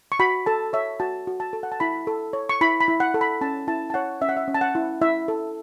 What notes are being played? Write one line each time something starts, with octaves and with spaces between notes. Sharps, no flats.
C#6
F#4 B5
A4 A5
C#5 E5
F#4 A5
F#4
A5
A4
F#5
A5
E4 B5
A4
C#5
C#6
E4 B5
B5
E4
F#5
A4
B5
C#4 A5
E4 A5
A5
C#5 F#5
C#4 E5
F#5
E5
C#4
A5
F#5
E4
E4 E5
A4